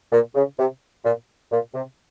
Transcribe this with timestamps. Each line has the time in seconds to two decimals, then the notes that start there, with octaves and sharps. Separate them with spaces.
0.12 A#2
0.35 C#3
0.58 C3
1.04 A#2
1.51 A#2
1.74 C3